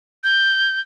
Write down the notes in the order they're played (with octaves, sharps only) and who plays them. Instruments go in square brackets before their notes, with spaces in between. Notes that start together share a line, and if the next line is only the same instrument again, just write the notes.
[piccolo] G6